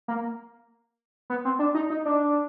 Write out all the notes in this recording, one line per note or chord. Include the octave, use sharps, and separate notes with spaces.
A#3
B3
C4
D4
D#4
D#4
D4